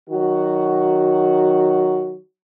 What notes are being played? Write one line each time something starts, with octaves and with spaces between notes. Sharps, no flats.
D#3 F#3 F#4